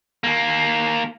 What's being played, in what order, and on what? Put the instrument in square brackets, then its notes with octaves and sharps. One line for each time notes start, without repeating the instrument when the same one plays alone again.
[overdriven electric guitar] D#2 A#3